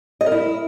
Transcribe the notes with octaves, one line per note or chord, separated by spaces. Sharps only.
D#5
A#4
E4